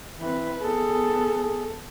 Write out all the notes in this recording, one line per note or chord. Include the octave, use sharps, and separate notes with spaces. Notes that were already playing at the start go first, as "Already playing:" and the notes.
E3 C4 B4
B3 G#4 A4